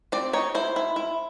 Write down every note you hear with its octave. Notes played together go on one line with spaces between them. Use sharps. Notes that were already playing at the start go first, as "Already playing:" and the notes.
C4 D5
D#4 C#5
E4 C5
E4
E4